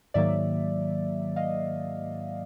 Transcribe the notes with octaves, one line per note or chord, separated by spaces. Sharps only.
G#2 D#3 F#3 A#3 D5 E5
D#5 F5